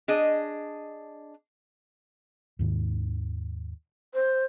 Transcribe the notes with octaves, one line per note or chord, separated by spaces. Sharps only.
D4 G#4 D#5
D#2 G#2 D#3
C5